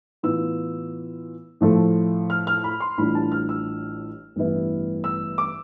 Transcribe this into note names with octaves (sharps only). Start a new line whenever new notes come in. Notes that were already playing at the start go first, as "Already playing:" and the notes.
A2 E3 B3 F4 E6
A2 F3 A3
F6
F6
B5
C6
A1 A2 G3 D4 F4 B5
A5
F6
E6
A1 G2 E3 B3 E4
E6
D6